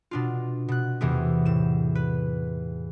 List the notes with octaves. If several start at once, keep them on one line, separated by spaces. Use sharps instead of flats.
B2 D4 F4
B2 F#6
E2 C3 E3 A3 B3
A2 E7
B4